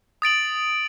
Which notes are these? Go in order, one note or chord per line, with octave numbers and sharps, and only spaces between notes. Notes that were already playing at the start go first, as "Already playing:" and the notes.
D#6 A6 D7 F#7